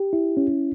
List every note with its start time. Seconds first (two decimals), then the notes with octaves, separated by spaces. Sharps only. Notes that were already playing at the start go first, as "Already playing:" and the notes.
Already playing: G4
0.13 E4
0.37 C#4